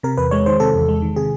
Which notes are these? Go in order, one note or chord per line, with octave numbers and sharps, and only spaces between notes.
C3 A#4
E2 B4
G#3 C#5
D#3 C5
C3 A4
E2
G#3
D#3
C3 G#4